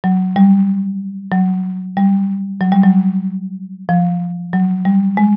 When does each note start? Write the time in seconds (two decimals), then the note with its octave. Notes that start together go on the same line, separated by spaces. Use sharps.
0.04 F#3
0.36 G3
1.32 F#3
1.97 G3
2.61 F#3
2.72 G3
2.83 F#3
3.89 F3
4.53 F#3
4.85 G3
5.17 G#3